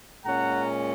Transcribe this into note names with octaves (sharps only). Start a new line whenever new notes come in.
A#2 G#3 C#4 F#5 A#5